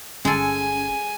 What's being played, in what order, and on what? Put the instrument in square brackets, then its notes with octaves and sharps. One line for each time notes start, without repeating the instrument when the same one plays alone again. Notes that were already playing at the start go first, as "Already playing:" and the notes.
[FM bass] G1 [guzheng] G#3 A4 [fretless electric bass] C#4 [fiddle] G#5